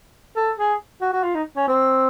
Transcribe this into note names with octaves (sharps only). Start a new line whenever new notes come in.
A4
G#4
F#4
F#4
F4
D#4
C#4
C4